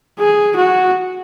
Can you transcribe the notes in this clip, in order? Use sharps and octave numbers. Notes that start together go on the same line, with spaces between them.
G#4
F#4